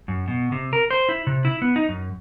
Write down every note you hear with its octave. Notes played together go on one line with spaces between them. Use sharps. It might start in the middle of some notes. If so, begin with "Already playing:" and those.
F#2
B2
C3
A#4
C5
E4
C3
E4
B3
D#4
F#2